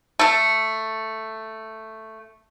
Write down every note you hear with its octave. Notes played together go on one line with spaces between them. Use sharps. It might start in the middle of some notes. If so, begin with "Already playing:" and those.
A3 A4